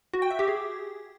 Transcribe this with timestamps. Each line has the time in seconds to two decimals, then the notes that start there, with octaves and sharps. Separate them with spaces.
0.14 F#4
0.22 G5
0.31 E5
0.39 G4
0.48 G#4